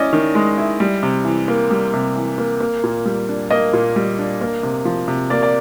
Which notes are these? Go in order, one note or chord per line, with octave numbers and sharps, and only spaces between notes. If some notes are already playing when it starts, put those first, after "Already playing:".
Already playing: C#4 E4 D5 D#5
D#3
G#3
E4
G3
C3
E3
A#3
G3
C3
E3
A#3
A#3
A#2
G3
D4
A#3 D#5
A#2
G3
D4
A#3
C3
F3
C3
A#3 D5
D5